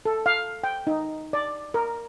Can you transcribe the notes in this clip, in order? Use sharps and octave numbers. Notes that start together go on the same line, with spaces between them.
A4
F5
G5
D#4
D5
A#4